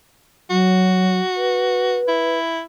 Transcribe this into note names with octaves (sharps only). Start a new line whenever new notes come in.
F#3 F#4
B4
E4